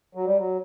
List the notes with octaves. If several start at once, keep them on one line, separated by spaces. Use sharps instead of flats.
F#3
G3
F#3